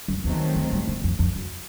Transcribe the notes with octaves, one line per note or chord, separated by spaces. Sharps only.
F#2
E2 D#3 F#3 A3 C4
F2
G2
F#2
E2
F2
F2
F#2